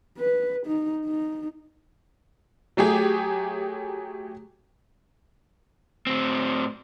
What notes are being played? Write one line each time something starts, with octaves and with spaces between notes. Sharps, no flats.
B4
D#4
D#4
F#3 A3 G4 G#4
A2 C4